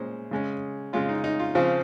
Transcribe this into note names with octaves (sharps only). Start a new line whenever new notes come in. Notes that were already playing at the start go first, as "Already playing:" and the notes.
Already playing: A#2 G#3 C#4 C5
C#3 G#3 C#4
C#3 G#3 C#4 F4
D#4
D#4
F4
C#3 F3 C4 F4